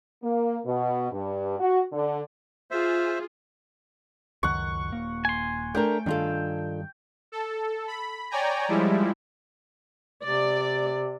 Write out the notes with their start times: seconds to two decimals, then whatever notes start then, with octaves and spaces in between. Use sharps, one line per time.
0.24 A#3
0.66 B2
1.12 G2
1.59 F#4
1.93 D3
2.71 F4 G#4 C5 E5
4.43 C#2 F#2 D#3 F#5 C#6
4.92 D#1 A#3
5.25 G#5 C6
5.75 A3 D4 A#4 G5
6.06 G2 D#3 D4 F4 A4
7.32 A4
7.87 B5
8.30 C#5 D5 G5 G#5 A#5
8.68 F3 G3 G#3 E4
10.25 C3 D5